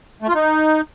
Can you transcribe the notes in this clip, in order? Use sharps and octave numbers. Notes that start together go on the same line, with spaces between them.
A3
F4
D#4